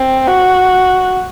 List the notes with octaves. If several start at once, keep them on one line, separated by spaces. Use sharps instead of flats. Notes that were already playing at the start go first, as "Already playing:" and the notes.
Already playing: C4
F#4